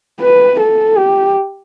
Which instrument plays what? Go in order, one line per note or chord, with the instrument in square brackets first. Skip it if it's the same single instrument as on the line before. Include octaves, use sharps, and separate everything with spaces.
[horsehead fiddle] B4
A4
G4